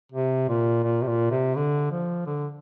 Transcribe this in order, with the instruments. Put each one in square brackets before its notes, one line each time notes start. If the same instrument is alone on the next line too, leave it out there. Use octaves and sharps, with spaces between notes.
[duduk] C3
A#2
A#2
C3
A#2
C3
D3
F3
D3